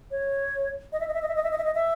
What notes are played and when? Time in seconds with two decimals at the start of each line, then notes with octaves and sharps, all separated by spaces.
0.11 C#5
0.93 D#5
1.00 E5
1.08 D#5
1.14 E5
1.22 D#5
1.28 E5
1.35 D#5
1.43 E5
1.51 D#5
1.58 E5
1.64 D#5
1.75 E5